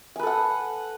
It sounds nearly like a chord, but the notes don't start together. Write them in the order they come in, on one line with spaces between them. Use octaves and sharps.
G#5 B4 A4 F#5